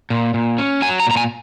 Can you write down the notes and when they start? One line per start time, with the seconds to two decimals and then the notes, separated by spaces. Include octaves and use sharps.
0.10 A#2
0.34 A#2
0.58 C#4
0.82 F#3 G#5
1.00 A#5
1.06 A#2
1.11 A#5
1.17 G#5